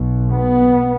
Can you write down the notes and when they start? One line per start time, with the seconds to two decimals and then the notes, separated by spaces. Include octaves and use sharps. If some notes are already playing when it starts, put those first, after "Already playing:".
Already playing: B1 B2
0.32 B3